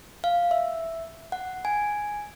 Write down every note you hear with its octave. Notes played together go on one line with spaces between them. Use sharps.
F5
E5
F#5
G#5